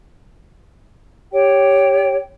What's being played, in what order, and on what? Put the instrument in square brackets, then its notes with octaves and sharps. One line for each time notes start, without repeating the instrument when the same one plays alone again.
[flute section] G4 C#5 G5